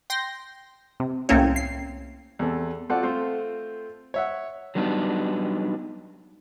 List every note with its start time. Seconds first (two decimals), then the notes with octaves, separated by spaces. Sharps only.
0.10 G5 C6 A#6
1.00 C3
1.29 C2 A2 A#3 C4 C#4 C#5
1.56 C7
2.39 E2 C3 A4
2.90 C4 F4 F#4 A4 D5 F#5
3.03 A3 C4 F4 C5
4.14 C#5 E5 F#5
4.75 F#3 G3 B3 D4 D#4